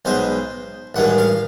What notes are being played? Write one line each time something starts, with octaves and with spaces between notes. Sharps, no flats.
B1 B2 G#3 C5
A1 G2 D#3 G#3 F#5
F5